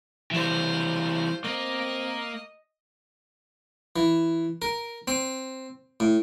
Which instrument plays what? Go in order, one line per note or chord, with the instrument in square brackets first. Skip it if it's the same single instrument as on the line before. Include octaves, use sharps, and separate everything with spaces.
[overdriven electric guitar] E3 G3 [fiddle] F4 C5
[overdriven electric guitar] A#3 [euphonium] C4 [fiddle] D#5
[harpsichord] E3
A#4
C4
A2